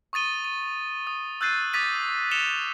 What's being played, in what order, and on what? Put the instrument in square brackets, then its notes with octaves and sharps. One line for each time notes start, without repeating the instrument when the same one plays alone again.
[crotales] C#6 D#6 A6 D#7 G7
D#7
D#6
E6 F#6 G6 A6 C7 D#7
D6 D#6 A6 B6 D#7
C#7 E7 F7 G7